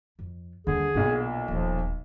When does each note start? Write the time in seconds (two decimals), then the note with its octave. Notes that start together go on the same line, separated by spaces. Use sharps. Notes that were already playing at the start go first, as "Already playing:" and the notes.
0.19 F2
0.67 D#2 D3 G3 G#4
0.94 B1 A#2 C#3 D4 F#4
1.48 D#1 F3